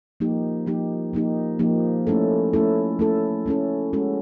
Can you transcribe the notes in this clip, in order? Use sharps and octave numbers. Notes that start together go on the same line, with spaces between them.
F3 A#3 D#4 G4
F3 A#3 D#4 G4
F3 A#3 D#4 G4
F3 A#3 D#4 G4
A3 C#4 E4 A4
A3 C#4 E4 A4
A3 C#4 E4 A4
A3 C#4 E4 A4
G#3 C#4 F#4 A4